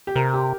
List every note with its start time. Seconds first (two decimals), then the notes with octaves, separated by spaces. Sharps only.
0.07 G4
0.16 C3 A#4
0.34 G4